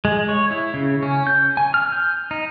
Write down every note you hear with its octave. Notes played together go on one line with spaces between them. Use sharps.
G#3
C#5
E4
C#3
C#4
G6
G#5
F6
G6
D#4